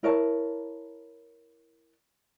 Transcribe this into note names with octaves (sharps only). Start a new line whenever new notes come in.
E4 A#4 C#5 A5